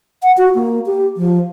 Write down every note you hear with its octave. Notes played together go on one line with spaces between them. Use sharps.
F#5
F#4
A#3
G4
F3